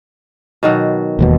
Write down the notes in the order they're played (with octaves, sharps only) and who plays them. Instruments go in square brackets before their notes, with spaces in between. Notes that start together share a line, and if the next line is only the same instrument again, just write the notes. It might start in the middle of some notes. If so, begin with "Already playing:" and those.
[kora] B2 D#3 F#3
[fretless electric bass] E1 D#2 B2